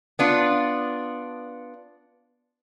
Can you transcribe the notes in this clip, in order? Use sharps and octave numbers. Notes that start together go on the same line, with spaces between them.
B3 D4 F4